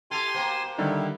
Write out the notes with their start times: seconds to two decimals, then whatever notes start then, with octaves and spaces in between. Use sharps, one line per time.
0.11 E4 G4 A4 G#5 C6
0.34 B2 A#3 C5
0.78 D3 D#3 G3 E4